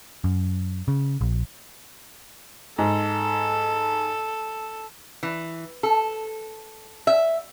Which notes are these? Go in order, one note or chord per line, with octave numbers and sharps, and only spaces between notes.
F#2
C#3
A#1
G#2 A4
E3
A4
E5